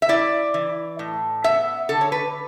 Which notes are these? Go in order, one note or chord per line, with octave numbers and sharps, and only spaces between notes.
E5
E4 D5
E3
A2
B3 E5
D3 A4
C#5
B4